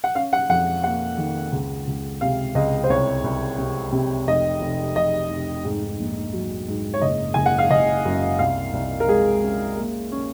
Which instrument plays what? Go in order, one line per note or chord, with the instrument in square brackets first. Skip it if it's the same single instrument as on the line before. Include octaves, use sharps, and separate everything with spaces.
[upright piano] F#5
C#4 F5
F#5
F2 F#5
A#3 F#5
D#3
C#2
C#2
C3 F5
C#2 D#5
C5
C2 C#5
C2
C3
C3
F1 D#5
F1
F1 D#5
F1
G#2
A#1
F#3
G#2
C#5
F#1 D#5
F#1 G#5
F#5
F5
F#1 D#5
F#2
C2 F5
C2
A#4
G#3 G#4
C#4
A#3
C#4